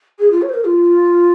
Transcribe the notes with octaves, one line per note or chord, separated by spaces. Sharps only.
G#4
F4
C#5
C5
A#4
F4